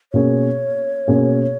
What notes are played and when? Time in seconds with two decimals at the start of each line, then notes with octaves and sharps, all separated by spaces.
0.13 B2 A#3 C#4 G#4 C#5
1.08 B2 A#3 C#4 G#4